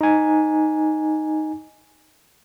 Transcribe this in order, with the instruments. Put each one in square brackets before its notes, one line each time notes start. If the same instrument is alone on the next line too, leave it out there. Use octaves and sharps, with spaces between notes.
[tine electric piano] D#4 G#5